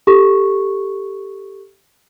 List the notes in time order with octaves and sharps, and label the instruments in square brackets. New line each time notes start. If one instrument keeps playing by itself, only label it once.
[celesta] G4 A4 C#6